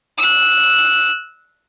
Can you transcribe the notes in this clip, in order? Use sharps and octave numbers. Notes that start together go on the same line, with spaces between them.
E6 F#6